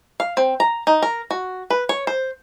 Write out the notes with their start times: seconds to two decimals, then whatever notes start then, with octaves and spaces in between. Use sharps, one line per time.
0.20 F5
0.37 C4
0.60 A#5
0.87 D#4
1.02 A#4
1.31 F#4
1.70 B4
1.89 C#5
2.07 C5